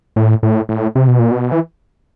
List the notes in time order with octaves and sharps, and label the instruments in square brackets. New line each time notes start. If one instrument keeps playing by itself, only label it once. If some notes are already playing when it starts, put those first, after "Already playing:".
[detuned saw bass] A2
A2
A2
C3
B2
A#2
B2
E3